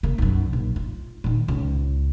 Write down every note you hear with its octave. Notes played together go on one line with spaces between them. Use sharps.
C#3 A#3
B1 F#2
A#1
F4
A#2 D#3
C#2